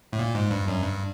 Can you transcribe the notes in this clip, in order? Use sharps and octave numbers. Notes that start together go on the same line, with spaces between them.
A2
A#2
G#2
G2
F#2
G2